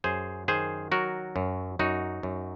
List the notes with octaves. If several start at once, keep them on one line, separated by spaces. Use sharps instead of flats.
F#2 G#4 C5
D#3 G#4 C5
F#3 F#4 A#4
F#2
F#2 D#4 F#4
F#2